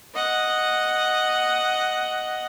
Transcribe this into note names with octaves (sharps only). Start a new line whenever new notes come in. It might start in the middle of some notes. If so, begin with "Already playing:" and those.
D#5 F#5